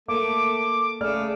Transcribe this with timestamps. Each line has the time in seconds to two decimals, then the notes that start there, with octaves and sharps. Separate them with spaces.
0.08 A3 A#3 D6
1.01 C#3 A3 D5 F6